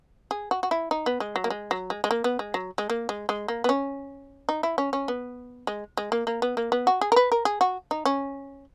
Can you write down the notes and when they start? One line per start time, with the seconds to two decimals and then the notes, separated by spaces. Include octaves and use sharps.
0.31 G#4
0.51 F#4
0.63 F#4
0.71 E4
0.91 D#4
1.06 B3
1.20 G#3
1.36 F#3
1.44 A#3
1.50 G#3
1.71 F#3
1.90 G#3
2.04 G#3
2.11 A#3
2.24 B3
2.39 G#3
2.54 F#3
2.78 G#3
2.90 A#3
3.09 G#3
3.29 G#3
3.48 A#3
3.64 B3
3.69 C#4
4.49 D#4
4.63 E4
4.78 C#4
4.93 C#4
5.08 B3
5.67 G#3
5.97 G#3
6.12 A#3
6.27 A#3
6.42 B3
6.57 A#3
6.72 B3
6.87 F#4
7.01 G#4
7.12 A#4
7.16 B4
7.32 A#4
7.45 G#4
7.61 F#4
7.91 D#4
8.05 C#4